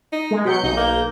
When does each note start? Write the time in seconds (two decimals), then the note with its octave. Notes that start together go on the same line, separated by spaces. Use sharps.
0.13 D#4
0.31 G#3
0.45 B2 F#3 G6 C#7
0.63 B1 D#4 G6
0.77 A#3